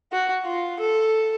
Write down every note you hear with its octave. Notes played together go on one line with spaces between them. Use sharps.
F#4
F4
A4